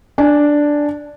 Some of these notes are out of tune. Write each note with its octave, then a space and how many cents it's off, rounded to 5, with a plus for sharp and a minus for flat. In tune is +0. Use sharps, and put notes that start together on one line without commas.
D4 +0 G#5 +0